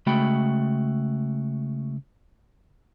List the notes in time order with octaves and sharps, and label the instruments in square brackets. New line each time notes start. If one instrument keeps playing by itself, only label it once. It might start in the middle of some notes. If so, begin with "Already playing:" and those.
[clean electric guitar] C#3 G#3 A3 F#4 G5 B5